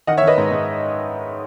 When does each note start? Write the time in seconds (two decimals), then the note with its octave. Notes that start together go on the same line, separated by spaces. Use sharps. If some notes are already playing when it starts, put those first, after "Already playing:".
0.07 D#3 D#5 F#5
0.17 C#5 E5
0.22 D#3
0.27 B4 D#5
0.38 G#2
0.51 G#2